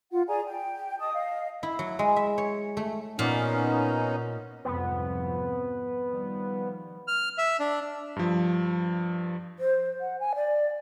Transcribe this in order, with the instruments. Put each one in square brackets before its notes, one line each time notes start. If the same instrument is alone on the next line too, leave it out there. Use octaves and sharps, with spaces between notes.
[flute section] F4 F#5
G#4 D5 G#5 A#5
G5
D#5 A5 D#6
D#5 F5
[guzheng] E4
F#3
G#3
E5
C#5
A3
[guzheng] A#2 [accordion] B3 C#4 D#4
[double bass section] C2 F2 G#2 [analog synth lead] B3
[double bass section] D#3 F3 G3
[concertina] F6
E5
D4
[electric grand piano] G2 F3
[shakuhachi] C5
F#5
G#5
D5